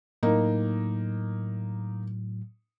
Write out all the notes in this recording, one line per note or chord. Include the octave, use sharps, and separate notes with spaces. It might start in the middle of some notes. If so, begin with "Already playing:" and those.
A2 F#3 A#3 D#4